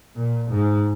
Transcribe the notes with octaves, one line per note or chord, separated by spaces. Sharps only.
A#2
G#2